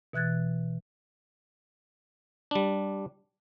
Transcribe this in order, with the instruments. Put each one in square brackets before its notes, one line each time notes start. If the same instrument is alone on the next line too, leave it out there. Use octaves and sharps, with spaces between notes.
[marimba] B2 E3 F#6 G#6 A6
[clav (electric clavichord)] G3 D4